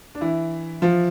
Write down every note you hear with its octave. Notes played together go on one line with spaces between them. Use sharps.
D4
E3 E4
F3 F4